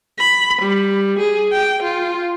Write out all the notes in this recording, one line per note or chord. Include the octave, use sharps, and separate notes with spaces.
B5
G3
G#4
G5
F4